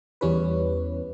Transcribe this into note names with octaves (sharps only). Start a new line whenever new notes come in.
E2 G3 C#4 E4 B4